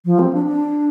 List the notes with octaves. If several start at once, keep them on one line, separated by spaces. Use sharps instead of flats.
F3
C4
D4
D4